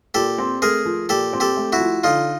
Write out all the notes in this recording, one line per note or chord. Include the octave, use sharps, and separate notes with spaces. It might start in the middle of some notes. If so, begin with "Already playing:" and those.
A#2 G4 A4
C4
A3 G#4 A#4
F3
A#2 G4 A4
C4
G4 A4
A3
E4 F#4
F3
D3 D#4 F4